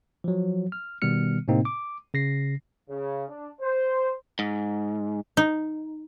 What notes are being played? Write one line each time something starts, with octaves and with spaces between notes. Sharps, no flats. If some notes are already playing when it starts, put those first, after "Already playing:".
F3 F#3
F6
B2 D#3 G3 B3 F6 C#7
A2 C3 A#3 C4 D#4
D6
C#3 A#6 C7
C#3
D4
C5
G#2
D#4